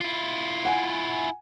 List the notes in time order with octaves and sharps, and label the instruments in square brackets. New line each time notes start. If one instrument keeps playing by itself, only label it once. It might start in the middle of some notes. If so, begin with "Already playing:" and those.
[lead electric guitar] E4 F4
[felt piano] F#5 G#5